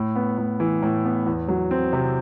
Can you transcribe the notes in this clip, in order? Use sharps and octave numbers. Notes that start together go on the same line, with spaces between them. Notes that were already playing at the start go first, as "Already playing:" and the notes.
Already playing: A2
B3
A2
E3
A2
B3
E2
F#3
C4
C3